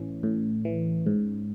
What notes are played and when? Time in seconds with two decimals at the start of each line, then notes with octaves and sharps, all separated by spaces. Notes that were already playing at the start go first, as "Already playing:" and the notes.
Already playing: A2 E3 C#4
0.23 A2
0.65 E3
1.06 G#2